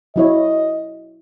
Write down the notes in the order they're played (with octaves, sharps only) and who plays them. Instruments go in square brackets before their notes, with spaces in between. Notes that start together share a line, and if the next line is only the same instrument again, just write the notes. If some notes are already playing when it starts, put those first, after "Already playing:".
[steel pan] F#3 E4 C#5 [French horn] D#5